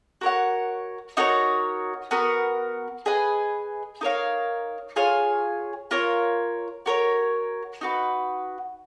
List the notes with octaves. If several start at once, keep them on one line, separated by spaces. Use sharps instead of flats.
F#4 A#4 C#5 F#5
D#4 F#4 A#4 C#5
B3 F#4 A#4
G#4 B4 D#5 G#5
D#4 A#4 C#5 F5
F4 G#4 C#5 G#5
F4 A#4 C#5
F#4 A#4 C#5
D#4 F#4 B4